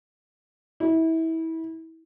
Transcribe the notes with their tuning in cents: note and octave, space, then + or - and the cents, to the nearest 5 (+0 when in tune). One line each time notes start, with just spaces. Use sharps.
E4 -25